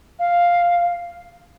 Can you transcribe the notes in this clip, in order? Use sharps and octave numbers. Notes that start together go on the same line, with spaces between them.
F5